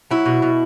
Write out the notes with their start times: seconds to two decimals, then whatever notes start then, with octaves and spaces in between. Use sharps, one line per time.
0.11 F#3 E4
0.26 B2
0.42 B2